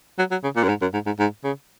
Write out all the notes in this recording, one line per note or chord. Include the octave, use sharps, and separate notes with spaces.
F#3
F#3
C#3
A#2
F#2
G#2
F#2
G#2
G#2
G#2
C#3